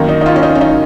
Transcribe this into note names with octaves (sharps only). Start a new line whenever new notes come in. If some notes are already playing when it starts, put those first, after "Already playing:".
Already playing: F#2 D#3 A#3
D#4
D#4
F4
C#4
D#4
C#4
D#4